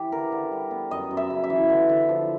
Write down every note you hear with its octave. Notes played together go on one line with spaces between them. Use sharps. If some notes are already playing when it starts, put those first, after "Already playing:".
Already playing: E3 G4
D3 A#4
D3
G3
B3
F#2 D#5
F#2
E5
C#3
E5
E3
D3
D3
F3